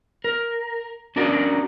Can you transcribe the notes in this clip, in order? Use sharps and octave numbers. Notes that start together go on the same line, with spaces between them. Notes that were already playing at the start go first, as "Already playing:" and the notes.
A#4
C#4 D4 F#4 A#4 D5